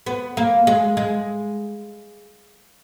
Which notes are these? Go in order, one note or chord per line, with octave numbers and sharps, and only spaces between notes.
B3
A#3
G#3
G#3